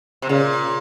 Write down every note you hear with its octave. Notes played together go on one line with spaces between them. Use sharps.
C3
A#2 C#3